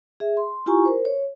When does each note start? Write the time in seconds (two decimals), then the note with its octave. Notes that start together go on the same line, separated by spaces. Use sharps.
0.20 G#4 E5
0.37 C6
0.66 E4 F4 G4 G#5 A#5 C#6
0.85 A#4 C5
1.05 C#5